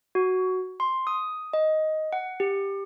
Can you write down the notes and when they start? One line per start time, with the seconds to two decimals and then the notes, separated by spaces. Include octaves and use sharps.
0.15 F#4
0.80 C6
1.07 D#6
1.53 D#5
2.13 F#5
2.40 G4